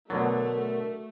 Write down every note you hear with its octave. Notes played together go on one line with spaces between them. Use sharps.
B2 D3 F#3 A3 D4 F#4 A#4 A6